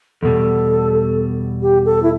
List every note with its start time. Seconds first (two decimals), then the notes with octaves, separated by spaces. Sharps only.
0.22 E2 B2 G3 A4
1.62 G4
1.85 A4
2.03 E4